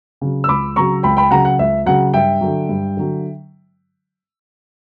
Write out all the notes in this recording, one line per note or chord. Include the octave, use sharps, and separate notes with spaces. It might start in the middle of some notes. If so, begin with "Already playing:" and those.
C#3 F#3
E6
C#2 B5 D6
C#3 F#3 A#5 C#6
C#2 G5 B5
G5 B5
C#3 F#3 F#5 A#5
F#5
C#2 E5
C#3 F#3 F#5
G2 E5 G5
D3 F#3
G2
D3 F#3